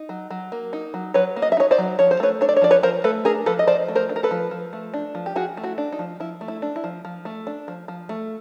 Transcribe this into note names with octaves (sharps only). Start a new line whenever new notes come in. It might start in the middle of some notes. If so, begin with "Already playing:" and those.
Already playing: D#4
F#3
F#3
A#3
D#4
F#3
F#3 B4 C#5
A#3
D#5
E5
D#4 C#5 D#5
C5 D5
F#3
F3 C#5
C5
A3 B4 C#5
D4 C#5
D5
C#5
F3 D5
B4 C#5
F3 A#4 C5
A3 A4 B4
D4 G#4 A#4
F3 A4 B4
D#5
F3 C5 D5
A3
A#4 C5
D4
A#4
A4 B4
F3
F3
A3
D4
F3
G4
F3 F#4 G#4
A3
E4 F#4
D4
D#4
F3
F3 E4
A3
E4
D4
E4
F3
F3
A3
D4
F3
F3
A3